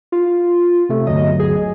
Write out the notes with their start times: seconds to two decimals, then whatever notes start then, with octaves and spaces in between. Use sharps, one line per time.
0.12 F4
0.89 C3 A3
1.07 G1 D2 F#3 D#5
1.39 G#4